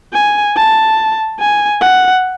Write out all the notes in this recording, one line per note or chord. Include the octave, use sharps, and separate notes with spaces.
G#5
A5
G#5
F#5